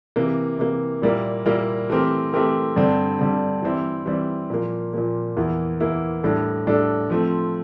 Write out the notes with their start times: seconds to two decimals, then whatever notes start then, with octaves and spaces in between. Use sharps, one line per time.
0.16 C3 E3 A#3
0.59 C3 E3 A#3
1.02 A#2 G3 A#3 E4 A#4
1.46 A#2 G3 A#3 E4 A#4
1.90 E3 A3 C4 G4 A#4
2.33 E3 A3 C4 G4 A#4
2.76 G2 D3 G3 C4
3.19 G2 D3 G3 C4
3.62 E3 G3 C4 E4
4.06 E3 G3 C4 E4
4.50 A#2 F3 A#3
4.93 A#2 F3 A#3
5.36 E2 E3 A#3 E4
5.80 E2 E3 A#3 E4
6.24 A2 G3 D4 A4
6.67 A2 G3 D4 A4
7.10 F3 A3 C4